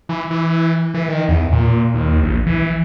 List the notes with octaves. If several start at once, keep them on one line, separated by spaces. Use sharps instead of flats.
E3
E3
E3
D#3
E2
A#2
D#2
A#1
E3